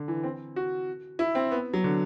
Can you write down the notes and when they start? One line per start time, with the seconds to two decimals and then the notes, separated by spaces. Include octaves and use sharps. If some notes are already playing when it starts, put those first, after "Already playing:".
Already playing: D3
0.08 E3
0.24 C4
0.56 F#4
1.19 E4
1.35 C4
1.51 B3
1.73 F#3
1.84 D3